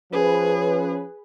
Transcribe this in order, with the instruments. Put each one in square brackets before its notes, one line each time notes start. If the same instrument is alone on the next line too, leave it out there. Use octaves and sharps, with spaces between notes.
[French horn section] F3 C#4 [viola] G#4 [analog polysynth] B4